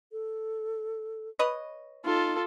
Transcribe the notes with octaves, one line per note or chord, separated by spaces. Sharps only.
A4
B4 C#5 D#5
D#4 F4 A4